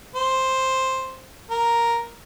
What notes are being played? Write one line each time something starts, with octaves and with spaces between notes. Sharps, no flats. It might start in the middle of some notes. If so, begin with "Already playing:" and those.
C5
A#4